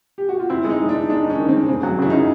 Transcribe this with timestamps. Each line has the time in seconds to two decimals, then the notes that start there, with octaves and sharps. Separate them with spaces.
0.18 G4
0.29 F#4
0.40 F4
0.50 C4 E4
0.64 G#3
0.70 D#4
0.80 G#3
0.89 D4
0.94 D#4
1.09 G#3 D4
1.24 D#4
1.30 C#4
1.39 D#3
1.49 G#3 C4
1.68 C#3 C4
1.83 F#3
1.98 C#3 E4
2.10 C#3 D#4